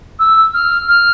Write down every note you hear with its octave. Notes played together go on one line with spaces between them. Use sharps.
E6
F6
F6